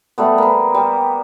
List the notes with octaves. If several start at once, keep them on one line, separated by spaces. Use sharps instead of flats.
G3 A3 B3
A#3 B3
G3